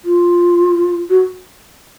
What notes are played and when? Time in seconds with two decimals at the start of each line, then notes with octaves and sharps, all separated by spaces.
0.05 F4
1.10 F#4